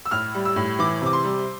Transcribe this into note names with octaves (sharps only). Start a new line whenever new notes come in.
E6
A2 F6
G3
E6
A2
E3 D6
C3 D6
C6
G3